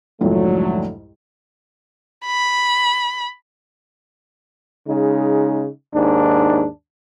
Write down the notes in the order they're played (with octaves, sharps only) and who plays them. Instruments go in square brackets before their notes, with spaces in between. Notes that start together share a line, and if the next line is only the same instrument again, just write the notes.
[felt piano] C2 F2 G#2 [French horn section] D3 F#3 A3
[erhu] B5
[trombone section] C#3 G#3 D#4
D#2 G#2 D4